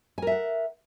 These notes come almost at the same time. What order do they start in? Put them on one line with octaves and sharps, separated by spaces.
G#5 A#4 E5 F#5